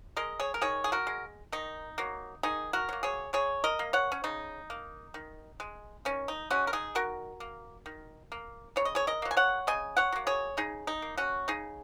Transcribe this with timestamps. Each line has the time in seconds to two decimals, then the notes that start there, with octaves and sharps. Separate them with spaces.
0.17 G#3 A#4 D#5
0.40 G#4 C#5
0.54 A#4
0.61 D#3 G#4 C#5
0.84 G#4
0.92 F#4 A#4
1.07 G#3
1.52 D#3 D#4
1.98 F#3 A#3
2.43 D#3 D#4 G#4
2.73 F#4 A#4
2.89 F#3 A#3
3.03 G#4 C#5
3.33 C#3 G#4 C#5
3.64 A#4 D#5
3.79 A#3
3.93 C#5 F#5
4.12 C#4
4.24 C#3 D#4
4.70 A#3
5.14 D#3
5.60 G#3
6.05 D#3 C#4
6.28 D#4
6.50 G#3 C#4 F#4
6.67 A#4
6.73 D#4 G#4
6.95 D#3 F#4 A#4
7.40 A#3
7.86 D#3
8.32 A#3
8.76 C#3 C#5
8.85 D#5
8.95 G#4 C#5
9.07 A#4 D#5
9.22 F#3 A#3
9.31 G#5
9.37 C#5 F#5
9.67 C#3 D#5 G#5
9.97 C#5 F#5
10.12 F#3 A#3
10.27 G#4 C#5
10.57 C#3 D#4 G#4
10.87 D#4
11.02 A#3
11.18 C#4 F#4
11.48 C#3 D#4 G#4